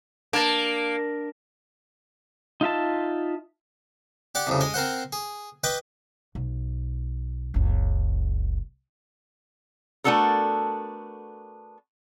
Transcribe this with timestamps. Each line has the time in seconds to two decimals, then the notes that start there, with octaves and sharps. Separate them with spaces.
0.33 A#3 D4 A5
2.61 D#4 F4 E5 A5
4.35 G4 D5 F#5 D6
4.47 C2 F2 C#3
4.61 G#3 D#5 G#5
4.74 C4 A#4 C5 F#5
5.13 G#4
5.64 B4 D#5 G5 B5 D6
6.35 B1
7.54 F#1 C#2
10.04 A3 B3 D4 F#4 A4 A#4